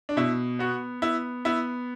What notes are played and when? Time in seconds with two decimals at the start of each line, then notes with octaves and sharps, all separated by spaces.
0.09 D4
0.17 B2 E4
0.59 B3 F#4
1.02 B3 E4
1.45 B3 E4